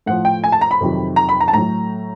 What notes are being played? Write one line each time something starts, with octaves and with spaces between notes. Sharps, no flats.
A2 F3 F#5
G5
G#5
A5
A#5
B5
F2 C3 D#3 F#3
A#5
B5
A#5
A5
A2 F#3 A#5